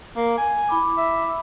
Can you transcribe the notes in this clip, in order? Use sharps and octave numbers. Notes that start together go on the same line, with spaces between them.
A#3
G#5
E4 B5 D6
E5